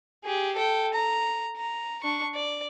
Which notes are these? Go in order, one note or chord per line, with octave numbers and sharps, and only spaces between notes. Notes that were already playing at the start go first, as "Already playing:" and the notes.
G4 G#4
A4 G5
A#5
A#5
D4 C#6
D5